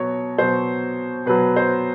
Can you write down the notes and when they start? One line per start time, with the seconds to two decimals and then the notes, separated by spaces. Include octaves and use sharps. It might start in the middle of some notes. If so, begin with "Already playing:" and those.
Already playing: B2 F#3 C#5
0.38 B2 F#3 C5
1.26 B2 F#3 B4
1.56 C5